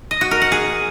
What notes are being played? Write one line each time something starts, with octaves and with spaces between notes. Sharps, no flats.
D#5
F#4
A#4
F#5
G#4